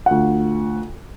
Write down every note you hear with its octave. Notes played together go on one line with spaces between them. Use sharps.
D2 F4 F#5